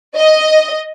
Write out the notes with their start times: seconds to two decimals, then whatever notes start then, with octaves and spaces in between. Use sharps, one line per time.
0.16 D#5